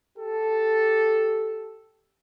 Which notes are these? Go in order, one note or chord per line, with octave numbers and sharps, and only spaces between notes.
G4 A4